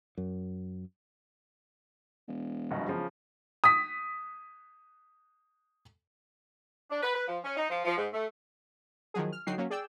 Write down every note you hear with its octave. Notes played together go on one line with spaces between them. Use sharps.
F#2
E1
G1 F#2 B2
C#3 F3
D#6 B6
D4
B4
B4
F3
C#4
D#4
F3
F3
G#2
A3
D#3 F3 F#3 G#4
F6
D3 F#3 D#4 F#4 G5 C7
F#3 A#3 C#4
G#4 D5 G5 E6